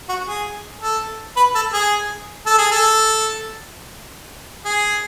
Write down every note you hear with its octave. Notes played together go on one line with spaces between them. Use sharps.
F#4
G#4
A4
B4
A4
G#4
A4
G#4
A4
G#4